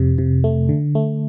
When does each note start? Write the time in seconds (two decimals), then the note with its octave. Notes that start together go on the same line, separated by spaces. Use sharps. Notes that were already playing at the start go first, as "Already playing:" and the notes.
Already playing: F2 C3
0.18 C3
0.44 A3
0.69 D3
0.95 A3